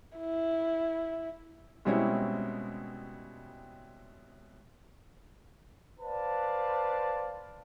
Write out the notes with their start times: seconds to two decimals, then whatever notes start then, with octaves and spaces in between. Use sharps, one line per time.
0.18 E4
1.85 B2 G3 G#3 C4 C#4 E4
6.00 B4 C5 D5 F5 A5